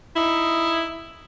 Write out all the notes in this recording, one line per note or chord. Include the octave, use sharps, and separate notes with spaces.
D#4 E4